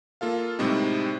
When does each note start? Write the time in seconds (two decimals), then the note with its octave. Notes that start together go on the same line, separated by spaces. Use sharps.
0.21 A#3 F4 A4 F5
0.59 A2 C3 G3 G#3 C4 D#4